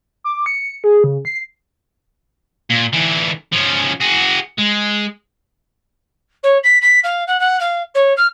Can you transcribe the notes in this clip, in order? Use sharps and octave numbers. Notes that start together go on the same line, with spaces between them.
D6
C#7
G#4
C#3
C7
A#2
D3 E3
F3 C#4
F#4 G#4
G#3
C#5
B6
B6
F5
F#5
F#5
F5
C#5
F6